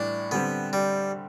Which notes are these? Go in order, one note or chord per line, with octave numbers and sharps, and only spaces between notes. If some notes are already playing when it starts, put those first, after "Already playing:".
Already playing: A2 E3 G3 D4
D3 G3 B3 C4
G3